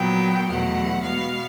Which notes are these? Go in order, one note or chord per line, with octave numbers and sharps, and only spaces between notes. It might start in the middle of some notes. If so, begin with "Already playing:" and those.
Already playing: A#2 F#3 B3 G5
E2 B2 F#3 A3 F#5
B2 G#3 B3 F5